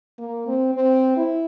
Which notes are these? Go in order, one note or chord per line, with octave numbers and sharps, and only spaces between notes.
A#3
C4
C4
E4